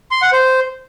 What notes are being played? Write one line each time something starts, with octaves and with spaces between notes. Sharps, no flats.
C6
F#5
C5